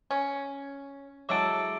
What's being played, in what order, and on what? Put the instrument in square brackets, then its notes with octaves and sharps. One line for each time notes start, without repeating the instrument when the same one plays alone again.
[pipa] C#4
[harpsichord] F#3 G#3 E4 [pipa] F#4 A4 [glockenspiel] D6 E6 D7